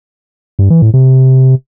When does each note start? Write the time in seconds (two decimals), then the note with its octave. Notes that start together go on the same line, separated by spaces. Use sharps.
0.59 G2
0.70 E3
0.82 A2
0.94 C3